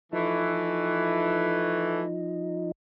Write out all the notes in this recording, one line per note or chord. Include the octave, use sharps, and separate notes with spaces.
E3 F3 A3 D#4